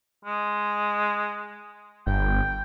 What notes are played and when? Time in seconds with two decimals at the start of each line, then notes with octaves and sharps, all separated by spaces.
0.25 G#3
2.07 G1 G5